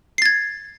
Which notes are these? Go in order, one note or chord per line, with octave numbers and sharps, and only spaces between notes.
G#6 A6 C7